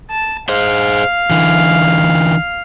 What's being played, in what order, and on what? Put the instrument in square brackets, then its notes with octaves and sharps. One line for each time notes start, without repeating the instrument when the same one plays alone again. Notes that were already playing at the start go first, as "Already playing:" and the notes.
[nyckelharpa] A5
[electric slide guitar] G#4 C5 [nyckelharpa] F5
[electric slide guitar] D3 E3